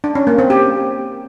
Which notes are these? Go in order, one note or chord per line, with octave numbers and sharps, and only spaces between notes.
D4
C#4
A#3
C4
G4